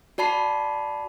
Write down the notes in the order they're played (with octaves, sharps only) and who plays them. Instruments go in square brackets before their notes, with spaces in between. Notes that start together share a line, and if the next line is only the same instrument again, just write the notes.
[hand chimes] F#4 D5 A5 B5 C7